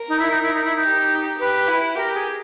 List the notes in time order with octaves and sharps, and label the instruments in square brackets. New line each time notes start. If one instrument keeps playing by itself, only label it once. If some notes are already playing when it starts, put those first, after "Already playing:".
Already playing: [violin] A#4
[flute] D#4
E4
D#4
E4
D#4
E4
D#4
[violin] G4
[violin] G4 [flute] B4
[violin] E4
[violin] G4 [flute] A#4
[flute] G#4